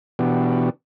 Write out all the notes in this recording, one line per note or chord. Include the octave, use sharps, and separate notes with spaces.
B2 E3 B3 D4 F#4 G4